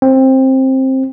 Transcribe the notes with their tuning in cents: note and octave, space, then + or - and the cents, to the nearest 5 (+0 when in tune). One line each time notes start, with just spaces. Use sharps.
C4 +15